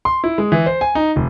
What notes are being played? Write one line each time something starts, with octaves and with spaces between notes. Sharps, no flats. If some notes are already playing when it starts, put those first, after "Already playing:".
C6
E4
G#3
E3
C5
G#5
D#4
F1